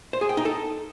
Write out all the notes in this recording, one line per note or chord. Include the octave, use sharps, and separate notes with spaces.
C5
G#4
G5
D#4
A4